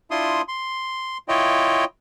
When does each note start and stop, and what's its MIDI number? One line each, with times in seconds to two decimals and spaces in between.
0.11 0.42 62
0.11 0.42 64
0.11 0.42 65
0.11 0.42 84
0.11 0.42 87
0.48 1.18 84
1.28 1.84 64
1.28 1.84 65
1.28 1.84 73
1.28 1.84 75
1.28 1.84 79